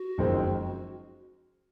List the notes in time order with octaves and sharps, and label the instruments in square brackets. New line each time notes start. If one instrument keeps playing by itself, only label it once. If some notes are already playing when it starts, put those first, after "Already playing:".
Already playing: [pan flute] F#4
[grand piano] F#1 F2 D#3 G#3 C4